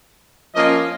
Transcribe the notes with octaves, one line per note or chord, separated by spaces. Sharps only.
F3 A#3 C#4 F4 D#5